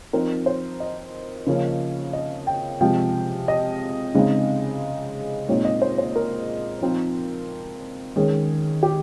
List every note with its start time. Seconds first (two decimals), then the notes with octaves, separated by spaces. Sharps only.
0.13 F3 C4 D#4 A#4
0.46 C5
0.80 D#5
1.47 C#3 F3 A#3 C#4
2.13 D#5
2.47 G5
2.81 C3 F3 G#3 G5
3.48 D#5
4.15 C#3 G#3 C4 D#4
5.48 A#2 G#3 C4 D#4 C#5
5.65 D#5
5.82 C5
5.98 C5
6.16 A#4
6.81 F3 C4 D#4
8.16 D#3 G#3 C#4 G#4
8.83 G4